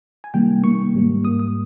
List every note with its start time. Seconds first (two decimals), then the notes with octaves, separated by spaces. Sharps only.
0.24 G#5
0.34 C3 D#3 G3 A#3 G5
0.63 C3 D#3 G3 A#3 C#6
0.94 G#2 G3 A#3
1.24 G#2 G3 A#3 D#6
1.39 D#6